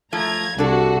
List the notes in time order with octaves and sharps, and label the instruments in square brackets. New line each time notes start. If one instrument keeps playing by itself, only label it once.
[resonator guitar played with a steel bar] F3 A3 F4 [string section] A#5 G#6
[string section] C2 F#4 [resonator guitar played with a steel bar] D4 A4